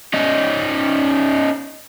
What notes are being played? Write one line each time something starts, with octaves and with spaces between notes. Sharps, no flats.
C#4 D#4